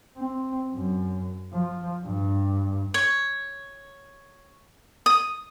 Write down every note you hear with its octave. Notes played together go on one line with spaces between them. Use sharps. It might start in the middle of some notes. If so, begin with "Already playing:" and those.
C4
F#2
F3
G2
C#5
D#6